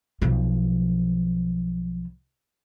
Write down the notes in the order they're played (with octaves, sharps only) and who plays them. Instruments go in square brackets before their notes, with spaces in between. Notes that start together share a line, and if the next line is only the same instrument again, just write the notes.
[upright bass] B1 F3